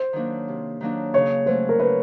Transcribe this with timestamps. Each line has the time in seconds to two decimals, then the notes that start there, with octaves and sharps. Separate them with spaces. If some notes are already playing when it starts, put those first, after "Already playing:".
Already playing: C5
0.13 D#3 F#3 A#3 D4
0.48 C3
0.81 D#3 F#3 A#3 D4
1.14 C#3 C#5
1.46 F#3 A3 C#4 C5
1.69 A#4
1.79 C#3 B4